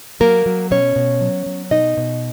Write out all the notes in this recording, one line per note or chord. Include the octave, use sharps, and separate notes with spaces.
F#3 A#3 A#4
F#3
B2 C#4 C#5
B2
F#3
F#3
B2 D#4 D#5
B2